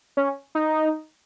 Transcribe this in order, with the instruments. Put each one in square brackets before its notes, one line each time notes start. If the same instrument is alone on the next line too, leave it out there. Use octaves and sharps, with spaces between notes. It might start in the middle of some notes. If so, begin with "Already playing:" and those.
[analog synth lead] C#4
D#4